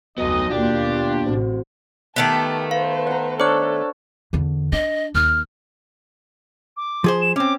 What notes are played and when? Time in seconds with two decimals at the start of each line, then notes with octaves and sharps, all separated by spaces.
0.18 F1 D2 F#3 B3 D#4 F#4 D#5
0.50 D#2 B2 A#3 D4 F4 G4
0.86 B3
1.26 A1 A2 C3 C4 F#4 C5
2.16 D#3 A3 B3 G4 A5
2.71 B4 C5 F5
3.07 F#5 A#5
3.40 D4 A4 C5 C#5 F#6
4.33 E2 D3
4.72 D4 D#5
5.15 D#2 F6
6.77 D6
7.04 F3 G#4 C5
7.21 E7
7.36 C4 C#4 D6